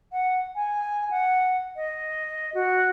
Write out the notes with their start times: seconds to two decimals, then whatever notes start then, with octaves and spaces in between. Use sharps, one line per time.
0.12 F#5
0.55 G#5
1.10 F#5
1.76 D#5
2.54 F#4